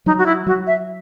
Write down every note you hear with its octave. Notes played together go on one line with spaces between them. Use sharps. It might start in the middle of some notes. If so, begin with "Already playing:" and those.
F#3 D#4
F#4
E4
F#3 F#4
E5